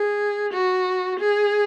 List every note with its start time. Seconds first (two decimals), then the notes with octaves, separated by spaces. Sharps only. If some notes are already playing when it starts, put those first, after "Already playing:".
Already playing: G#4
0.53 F#4
1.19 G#4